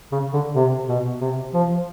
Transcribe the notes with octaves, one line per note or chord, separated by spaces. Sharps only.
C#3
D3
C3
B2
C3
F3